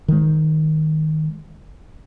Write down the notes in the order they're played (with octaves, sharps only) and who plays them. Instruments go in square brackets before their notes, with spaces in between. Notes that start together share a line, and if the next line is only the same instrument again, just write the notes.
[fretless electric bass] D#3 G#3